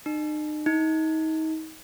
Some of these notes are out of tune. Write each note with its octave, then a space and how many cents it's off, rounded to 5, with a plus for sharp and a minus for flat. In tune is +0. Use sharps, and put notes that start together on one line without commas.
D#4 -40
D#4 +30